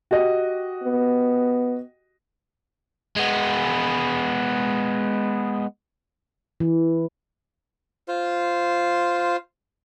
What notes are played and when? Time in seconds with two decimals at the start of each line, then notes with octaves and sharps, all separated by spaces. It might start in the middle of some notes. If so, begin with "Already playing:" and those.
0.11 F#4 G4 D#5
0.83 B3
3.16 G#3 B3
6.60 E3
8.08 F4 C5